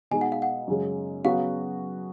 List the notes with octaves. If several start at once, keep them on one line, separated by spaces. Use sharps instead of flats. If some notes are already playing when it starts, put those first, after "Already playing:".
B2 G#3 D#4 G#5
F#5
F5
F#5
F#2 C#3 G#3
C#3 F#3 B3 F#4 F5